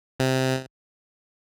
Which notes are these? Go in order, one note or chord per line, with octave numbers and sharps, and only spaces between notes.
C3